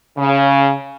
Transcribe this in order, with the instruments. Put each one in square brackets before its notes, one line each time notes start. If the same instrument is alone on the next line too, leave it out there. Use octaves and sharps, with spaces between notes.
[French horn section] C#3